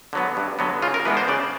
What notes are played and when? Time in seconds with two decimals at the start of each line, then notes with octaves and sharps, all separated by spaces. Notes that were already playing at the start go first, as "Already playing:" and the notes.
0.13 D3 F#3 B3
0.37 G2
0.59 D3 F#3 B3
0.82 C#3 F4
0.94 A#4
1.05 E3 G#3 B3 D4 B4
1.17 C5
1.28 C#3 D5